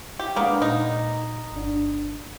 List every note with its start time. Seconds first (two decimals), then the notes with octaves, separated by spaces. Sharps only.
0.19 G4
0.36 G#3 A#3 B3 D4
0.62 A#2 D#4
1.52 G1 D4